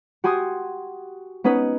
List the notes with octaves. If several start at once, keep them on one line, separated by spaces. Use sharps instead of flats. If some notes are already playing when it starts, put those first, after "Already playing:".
F#4 G4 G#5 C6 D#6
B3 C#4 D#4 B4